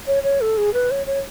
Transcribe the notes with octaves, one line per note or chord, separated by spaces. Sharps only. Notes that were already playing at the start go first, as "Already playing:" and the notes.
C#5
C#5
A4
G#4
B4
C#5
C#5